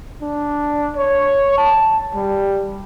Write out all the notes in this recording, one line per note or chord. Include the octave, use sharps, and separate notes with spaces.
D4
C#5
A5
G3